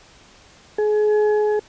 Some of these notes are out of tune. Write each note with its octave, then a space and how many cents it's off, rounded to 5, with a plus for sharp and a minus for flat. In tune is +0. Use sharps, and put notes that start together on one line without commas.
G#4 +30